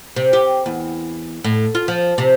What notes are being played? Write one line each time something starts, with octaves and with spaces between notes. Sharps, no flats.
C3
G4
E2
A2
F4
F3
C3